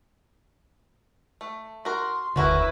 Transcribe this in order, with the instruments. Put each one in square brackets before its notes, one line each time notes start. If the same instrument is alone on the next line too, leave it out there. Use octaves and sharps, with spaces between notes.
[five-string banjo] A3
[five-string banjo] F#4 A#4 [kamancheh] C6
[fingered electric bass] E1 D2 D3 [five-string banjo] C#4 F#4 A#4 [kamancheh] E4 B4